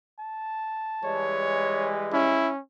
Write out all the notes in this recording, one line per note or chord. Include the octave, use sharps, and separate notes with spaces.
A5
E3 G3 G#3 C#5
C#4 E4